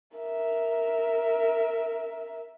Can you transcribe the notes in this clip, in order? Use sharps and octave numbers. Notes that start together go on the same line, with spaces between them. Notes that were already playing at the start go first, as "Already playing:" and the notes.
A#4 E5